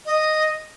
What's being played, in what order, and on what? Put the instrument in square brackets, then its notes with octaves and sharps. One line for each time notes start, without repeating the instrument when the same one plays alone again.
[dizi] D#5